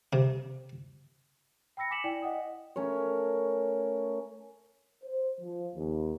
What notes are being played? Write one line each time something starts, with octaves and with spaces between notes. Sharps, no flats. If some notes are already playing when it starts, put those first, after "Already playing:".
C3
G5 B5 E6 A#6 C#7
G#5 D6 B6 C#7 E7 F#7
E4 D5 G5 G#5
D#5 F#5 G5 D#6
A3 C#4 A#4 C#5
C5
F3
D#2